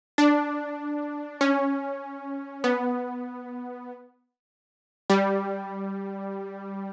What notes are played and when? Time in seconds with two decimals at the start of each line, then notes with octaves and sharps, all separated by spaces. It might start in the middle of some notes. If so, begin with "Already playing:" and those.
0.18 D4
1.41 C#4
2.64 B3
5.10 G3